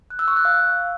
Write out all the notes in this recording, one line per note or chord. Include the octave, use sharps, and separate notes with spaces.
F#6
E6
C#6
F#6
F5